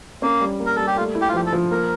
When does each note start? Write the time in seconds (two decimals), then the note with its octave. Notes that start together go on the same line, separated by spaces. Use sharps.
0.22 A#3 C#4
0.41 G3
0.59 A#3
0.66 A#4
0.76 G3 A4
0.87 G4
0.96 A3 F4
1.15 E4
1.21 G4
1.29 F4
1.34 F3 G4
1.46 A4
1.53 F3
1.71 A#3 A#4